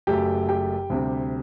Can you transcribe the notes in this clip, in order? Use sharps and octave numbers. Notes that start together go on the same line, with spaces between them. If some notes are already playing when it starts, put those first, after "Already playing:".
F#1 F#2 F#3 A3 G4 G5
G4 G5
D2 C3 G3